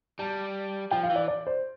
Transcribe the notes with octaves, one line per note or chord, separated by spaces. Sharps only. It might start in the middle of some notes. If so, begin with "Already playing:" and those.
G3 A5
F3 G5
F5
E3
D5
D5
C5